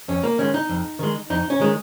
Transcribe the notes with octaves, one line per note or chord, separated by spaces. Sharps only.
F2 C#4
A#3
D#3 G#3 C#4
D#4
F2
D#3 G#3
F2 D#4
C#4
D#3 G#3